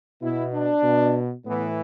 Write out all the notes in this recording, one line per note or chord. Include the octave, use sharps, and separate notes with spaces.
B2 E4
D4
B2
A2 E3 B3